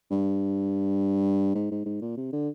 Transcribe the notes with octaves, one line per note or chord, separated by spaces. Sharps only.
G2
G#2
G#2
G#2
A#2
C3
D3